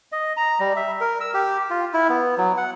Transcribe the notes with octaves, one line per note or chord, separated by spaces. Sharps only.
D#5
A#5
G3
E5
A#4
E6
G4
F4
E4
B3
F#3
F#5